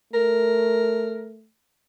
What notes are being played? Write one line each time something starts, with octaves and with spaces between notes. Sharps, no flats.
A3 A#4